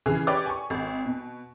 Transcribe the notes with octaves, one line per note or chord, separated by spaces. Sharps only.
C#3 E3 G#4
G4 B4 C#5 D5 G5 D6
G#5 C#6
G#1
B2